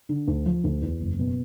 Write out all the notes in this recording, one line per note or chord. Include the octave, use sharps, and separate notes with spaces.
D3
D2
F3
D2
E2
F#1
B2